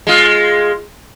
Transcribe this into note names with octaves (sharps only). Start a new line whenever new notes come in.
G#3 F4